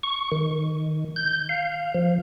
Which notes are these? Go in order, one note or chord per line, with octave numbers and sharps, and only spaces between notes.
C#6
D#3
G6
F5
F3